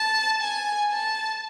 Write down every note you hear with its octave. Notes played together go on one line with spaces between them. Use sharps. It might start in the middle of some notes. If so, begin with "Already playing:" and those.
Already playing: A5
G#5
A5